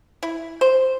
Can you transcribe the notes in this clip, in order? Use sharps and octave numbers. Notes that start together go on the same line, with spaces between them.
E4
C5